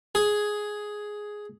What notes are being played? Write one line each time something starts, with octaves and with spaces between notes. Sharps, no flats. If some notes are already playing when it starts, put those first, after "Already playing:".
G#4